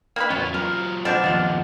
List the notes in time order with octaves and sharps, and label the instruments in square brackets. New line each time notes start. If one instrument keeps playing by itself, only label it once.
[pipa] A#3 G#4 B4
[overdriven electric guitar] E2 C#4 [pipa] B3 F#4
[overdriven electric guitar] F#3 F4 [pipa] A#4
[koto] B2 D4 [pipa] F3
[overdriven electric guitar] D#2 F3 [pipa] F4 F#5